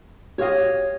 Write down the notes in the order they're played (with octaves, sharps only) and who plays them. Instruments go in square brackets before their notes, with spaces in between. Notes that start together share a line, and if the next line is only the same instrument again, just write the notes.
[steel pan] F#4 G4 F5 [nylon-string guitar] C#5 D#5